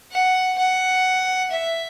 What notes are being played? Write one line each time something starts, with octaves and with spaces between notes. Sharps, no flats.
F#5
F#5
E5